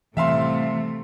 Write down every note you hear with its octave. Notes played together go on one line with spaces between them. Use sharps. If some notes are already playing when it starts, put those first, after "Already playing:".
A2 C3 E3 G3 A3 E5 F5 C6